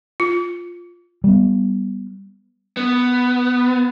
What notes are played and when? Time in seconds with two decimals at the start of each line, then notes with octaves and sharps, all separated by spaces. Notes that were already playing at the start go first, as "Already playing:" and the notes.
0.20 F4
1.24 G3 B3
2.77 B3